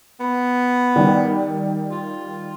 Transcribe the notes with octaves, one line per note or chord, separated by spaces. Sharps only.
B3
D#3 G3
F4